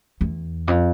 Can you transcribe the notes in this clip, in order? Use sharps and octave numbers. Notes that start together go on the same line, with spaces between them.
E2
F2